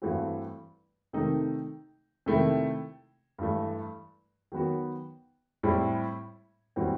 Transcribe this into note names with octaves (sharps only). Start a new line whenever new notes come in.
G2 E3 A3 C4 F#4
C3 D#3 A3 D#4
C3 D#3 A3 E4
G2 E3 A3
D#3 F#3 B3 F#4
A2 G3 C4 E4
A2 E3 G3 C4 F#4